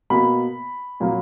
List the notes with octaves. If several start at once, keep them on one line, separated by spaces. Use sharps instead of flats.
B2 A#3 B5
A#2 F#3 A#3